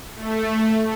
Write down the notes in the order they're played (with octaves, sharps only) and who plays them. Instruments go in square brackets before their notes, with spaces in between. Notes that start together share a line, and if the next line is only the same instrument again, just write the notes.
[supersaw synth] A3